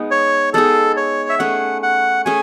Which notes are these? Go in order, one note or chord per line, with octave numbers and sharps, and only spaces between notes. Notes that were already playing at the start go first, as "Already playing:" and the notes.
Already playing: G#3 B3 D#4 G#4
C#5
G#3 B3 D#4 G#4 A4
C#5
E5
A3 C#4 G#4 B4 F#5
F#5
A3 C#4 G#4 G#5